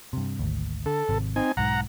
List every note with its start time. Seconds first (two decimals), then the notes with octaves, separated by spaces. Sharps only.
0.13 G2 C3
0.39 G#1 D2
0.86 D3 A4
1.09 G#1 C3
1.36 C4 D#4 G#5
1.57 B1 G#2 F#5 A#5